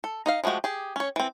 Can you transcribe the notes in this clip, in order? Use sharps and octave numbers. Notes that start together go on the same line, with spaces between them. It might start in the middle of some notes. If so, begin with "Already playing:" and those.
A4
D#4 D#5 F5
F3 G#3 A3 F#4 G4
G4 G#4
C#4 C#5
E3 C4